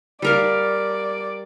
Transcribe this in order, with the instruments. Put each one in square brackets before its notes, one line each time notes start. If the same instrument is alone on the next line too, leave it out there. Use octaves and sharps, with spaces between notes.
[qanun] G3 A#4 F5 [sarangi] D5